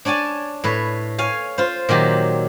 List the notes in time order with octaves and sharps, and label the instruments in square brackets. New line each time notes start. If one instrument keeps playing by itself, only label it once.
[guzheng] D4 C#5 D5 G#5 A5
A2 B4 C#5
C#5 F5 G#5
F4 C5
A#2 D#3 F#3 G4